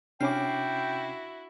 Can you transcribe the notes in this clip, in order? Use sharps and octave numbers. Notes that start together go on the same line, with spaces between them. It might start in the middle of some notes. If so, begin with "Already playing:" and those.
C3 C#4 D4 E4 F#4 G5 D6 C7